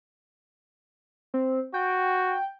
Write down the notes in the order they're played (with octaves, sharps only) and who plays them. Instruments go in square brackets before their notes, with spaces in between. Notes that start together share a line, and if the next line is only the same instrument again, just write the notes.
[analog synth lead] C4
[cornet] F#4 [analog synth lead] G5